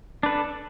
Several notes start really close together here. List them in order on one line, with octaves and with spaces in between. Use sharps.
D4 B4 A4